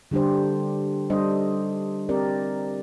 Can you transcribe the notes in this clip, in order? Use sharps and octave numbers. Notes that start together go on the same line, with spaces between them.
D3 G3 D4 G4 C5
G3 D4 A4 C5 D#5
C4 G4 A#4 D5